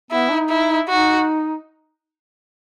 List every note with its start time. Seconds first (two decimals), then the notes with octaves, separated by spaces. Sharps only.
0.11 B3 E4
0.30 D#4
0.49 E4
0.87 D#4 F#4